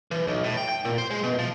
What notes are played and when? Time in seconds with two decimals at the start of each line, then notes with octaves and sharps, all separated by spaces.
0.11 E3
0.27 B1
0.44 A2
0.57 G5
0.69 G5
0.85 A#2
0.98 C5
1.11 G#3
1.23 B2
1.39 F3